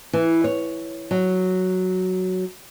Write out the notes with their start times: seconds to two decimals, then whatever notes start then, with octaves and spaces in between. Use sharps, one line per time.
0.13 E3
0.44 C#5
1.11 F#3